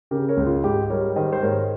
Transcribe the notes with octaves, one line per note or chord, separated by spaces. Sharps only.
C#3 G4 A#4
A#4 C#5
C#2
F4
G#2 G4
G3 A#4 C#5
D#3 C5 D#5
C5
G#2 A#4 C#5